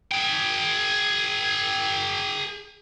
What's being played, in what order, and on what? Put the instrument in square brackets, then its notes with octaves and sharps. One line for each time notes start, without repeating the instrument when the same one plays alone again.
[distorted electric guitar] G#4 G5